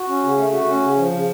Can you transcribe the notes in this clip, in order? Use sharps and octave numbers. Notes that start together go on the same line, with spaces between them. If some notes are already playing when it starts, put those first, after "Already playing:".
Already playing: F#4
C#4
C#3
A3
F#4
C#4
C#3
F3
C#3